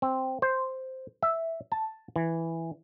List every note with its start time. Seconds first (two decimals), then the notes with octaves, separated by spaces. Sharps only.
0.02 C4
0.42 C5
1.23 E5
1.72 A5
2.16 E3